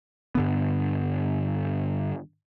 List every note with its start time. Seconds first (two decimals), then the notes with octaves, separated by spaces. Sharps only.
0.35 G2 D3 B3